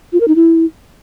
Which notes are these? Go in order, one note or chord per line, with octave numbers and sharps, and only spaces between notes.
F4
A#4
D#4
E4